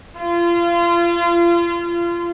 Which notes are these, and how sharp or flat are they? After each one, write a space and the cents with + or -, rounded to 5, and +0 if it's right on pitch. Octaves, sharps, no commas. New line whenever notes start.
F4 -30